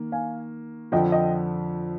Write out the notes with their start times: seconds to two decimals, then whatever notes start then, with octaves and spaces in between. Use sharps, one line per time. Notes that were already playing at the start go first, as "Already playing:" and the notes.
Already playing: D#3 A#3
0.12 F5 G#5
0.92 F2 D3 F3 D#5 G5
1.12 D#5 G5